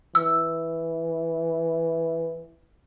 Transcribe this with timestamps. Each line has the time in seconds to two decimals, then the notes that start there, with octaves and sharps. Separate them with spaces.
0.15 E3 E6